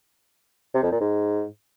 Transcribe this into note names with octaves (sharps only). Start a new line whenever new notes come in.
C3
F2
A#2
G#2